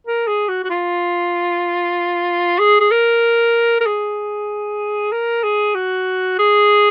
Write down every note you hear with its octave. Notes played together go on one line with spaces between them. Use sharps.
A#4
G#4
F#4
F#4
F4
G#4
G#4
A#4
A#4
G#4
A#4
G#4
F#4
G#4